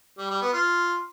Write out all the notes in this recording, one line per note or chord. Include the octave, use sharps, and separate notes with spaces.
G3
G3
B3
F4